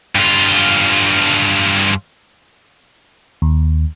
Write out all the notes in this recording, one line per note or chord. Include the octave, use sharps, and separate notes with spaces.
G2 F4
D#2